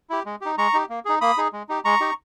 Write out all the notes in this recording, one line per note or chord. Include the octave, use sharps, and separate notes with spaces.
E4 G4
G#3
D#4 G4
G#3 A#5 C#6
D#4 G4
A#3
D#4 G#4
A#3 B5 D#6
D#4 G#4
G#3
D#4 G4
G#3 A#5 C#6
D#4 G4